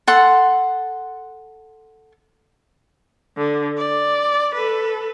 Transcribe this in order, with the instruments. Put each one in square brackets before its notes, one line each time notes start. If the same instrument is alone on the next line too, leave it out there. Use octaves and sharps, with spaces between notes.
[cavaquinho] A4 F#5 C6
[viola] D3
D5
A4 B4